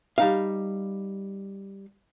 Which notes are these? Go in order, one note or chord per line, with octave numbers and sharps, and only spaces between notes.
G3 D#4 F5